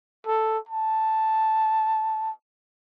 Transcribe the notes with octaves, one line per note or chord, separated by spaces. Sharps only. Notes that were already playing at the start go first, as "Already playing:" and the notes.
A4
A5